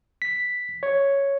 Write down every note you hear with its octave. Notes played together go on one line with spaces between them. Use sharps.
B6
C#5